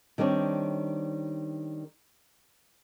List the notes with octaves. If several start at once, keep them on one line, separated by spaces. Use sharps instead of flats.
D#3 G3 C4 D4 C#5